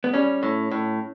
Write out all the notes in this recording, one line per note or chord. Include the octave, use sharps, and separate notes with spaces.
B3
G3 C#4
A2
A2